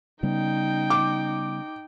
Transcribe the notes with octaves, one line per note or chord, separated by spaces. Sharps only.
C#3 G3 B3 D#4 G5
D6